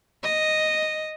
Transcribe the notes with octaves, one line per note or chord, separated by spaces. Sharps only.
D#5